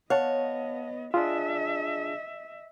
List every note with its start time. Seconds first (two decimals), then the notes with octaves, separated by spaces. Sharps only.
0.10 B3 C#5 D#5 F5 F#5 A5
1.14 D4 F4 G#4 D#5 E5